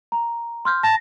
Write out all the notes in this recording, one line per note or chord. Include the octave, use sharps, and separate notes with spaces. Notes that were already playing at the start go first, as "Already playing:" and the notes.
A#5
C6 F6 G6
A5 A#6